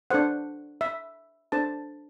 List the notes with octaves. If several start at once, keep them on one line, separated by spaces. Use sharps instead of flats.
D4 A4 C5 F#5
E5
D4 A4 C5 A5